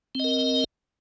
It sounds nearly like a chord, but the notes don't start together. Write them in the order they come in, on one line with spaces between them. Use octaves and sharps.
C4 D#5 A#4